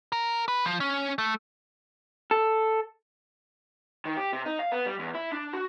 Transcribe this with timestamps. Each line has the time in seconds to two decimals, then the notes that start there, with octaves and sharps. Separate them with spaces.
0.12 A#4
0.48 B4
0.65 F3
0.80 C#4
1.18 A3
2.31 A4
4.05 D#3
4.17 G4
4.33 C3
4.45 D#4
4.59 F5
4.72 B3
4.86 G3
4.99 E2
5.15 E4
5.32 D4
5.53 F#4